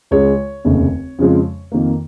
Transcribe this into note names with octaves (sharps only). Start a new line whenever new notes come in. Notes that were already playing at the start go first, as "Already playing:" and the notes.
C#2 C#3 G#3 C#5
F1 D#2 C#3
F2 C#3 F3 G#3
F2 D#3 A#3